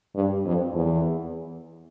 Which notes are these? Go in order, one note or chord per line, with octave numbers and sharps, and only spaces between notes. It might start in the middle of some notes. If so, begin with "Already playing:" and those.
G2
F2
E2